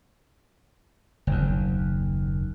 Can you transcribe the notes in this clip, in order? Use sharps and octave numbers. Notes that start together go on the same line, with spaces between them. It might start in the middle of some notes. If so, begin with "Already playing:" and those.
F#1 D#2